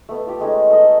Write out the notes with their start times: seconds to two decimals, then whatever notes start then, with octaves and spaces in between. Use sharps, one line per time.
0.09 A3 B3
0.27 F4 G4
0.40 G#3 A3 C#4 D#4
0.71 A4 D#5